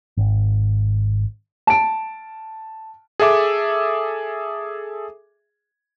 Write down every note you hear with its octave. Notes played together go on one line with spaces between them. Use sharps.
G#1
A5 D7
G#4 A4 E5 D6